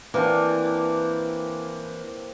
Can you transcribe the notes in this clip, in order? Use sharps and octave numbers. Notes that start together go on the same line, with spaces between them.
E3 A#3 C4 D4